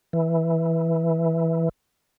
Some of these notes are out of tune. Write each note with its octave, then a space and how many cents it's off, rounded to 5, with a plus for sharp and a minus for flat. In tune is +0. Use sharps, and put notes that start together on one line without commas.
E3 -5